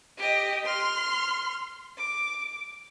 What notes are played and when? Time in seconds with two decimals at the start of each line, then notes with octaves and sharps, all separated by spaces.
0.18 G4 D#5
0.65 C6 F6
1.98 D6